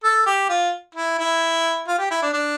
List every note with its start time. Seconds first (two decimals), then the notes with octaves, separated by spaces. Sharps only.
0.04 A4
0.26 G4
0.49 F4
0.95 E4
1.19 E4
1.88 F4
1.99 G4
2.11 E4
2.22 D4
2.33 D4